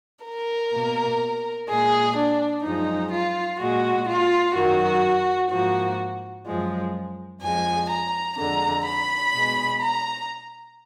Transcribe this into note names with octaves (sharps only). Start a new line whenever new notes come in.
A#4
B2 A#3
A#2 G#3 G#4
D4
F#2 F3 G#3 D#4
F4
A#2 G#3 F#4
F4
F#2 D#3 F#3 F#4
G#2 F3 A#3 F#4
F#2 F3 G#3
F2 F3 G#3 G#5
A#5
F2 D3 G#3 A#5
B5
B2 G#3
A#5